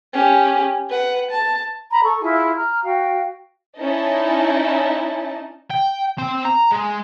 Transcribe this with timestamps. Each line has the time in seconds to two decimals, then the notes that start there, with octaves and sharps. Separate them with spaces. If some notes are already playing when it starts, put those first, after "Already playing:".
0.13 C#4 G4
0.89 B4 F#5
1.31 A5
1.91 A#5 B5
2.03 A4 C#6
2.22 E4 F4 G#4 E5
2.55 A#5 F6
2.83 F#4 F5 G5
3.77 C#4 D#4 E4 D5 D#5 A5
5.70 G5
6.18 C4 G5
6.45 A#5
6.72 G#3